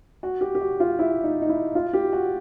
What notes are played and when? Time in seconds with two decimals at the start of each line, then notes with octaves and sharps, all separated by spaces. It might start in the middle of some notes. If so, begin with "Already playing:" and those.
0.23 F#4
0.41 G4
0.55 G4
0.61 F#4
0.80 F4
0.99 E4
1.24 D#4
1.42 D#4
1.49 E4
1.75 F4
1.93 G4
2.13 F#4